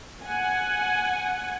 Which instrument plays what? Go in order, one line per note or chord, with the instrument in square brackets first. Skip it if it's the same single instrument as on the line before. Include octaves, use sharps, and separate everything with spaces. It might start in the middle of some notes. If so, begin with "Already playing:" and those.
[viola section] F#5 G#5